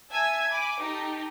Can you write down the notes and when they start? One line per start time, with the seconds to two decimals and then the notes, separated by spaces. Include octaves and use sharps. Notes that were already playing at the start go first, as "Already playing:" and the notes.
0.12 E5 G#5 A5 E6 G#6
0.51 G#5 B5 D6
0.79 D#4 G4 A4